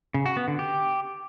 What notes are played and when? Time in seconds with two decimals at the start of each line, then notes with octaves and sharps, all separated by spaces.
0.14 C#3
0.26 F#4
0.37 B3
0.48 D3
0.59 G4